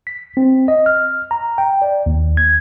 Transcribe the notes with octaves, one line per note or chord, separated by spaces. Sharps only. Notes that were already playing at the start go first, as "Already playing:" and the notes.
B6
C4
D#5
F6
A#5
G5
D5
D#2
G#6